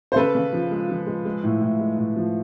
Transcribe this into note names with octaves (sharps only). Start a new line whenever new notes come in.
C5
C#3 A4 B4
C#3
F3
G#3
F3
G#3
G#3
A2
A2
G#3
A2
F3